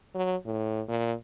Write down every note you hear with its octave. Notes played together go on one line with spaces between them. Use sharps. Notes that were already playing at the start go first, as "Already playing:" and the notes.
F#3
A2
A#2